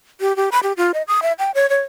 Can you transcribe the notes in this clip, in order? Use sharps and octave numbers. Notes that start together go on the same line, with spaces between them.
G4
G4
B5
G4
F4
D#5
D#6
E5
G5
C#5
C#5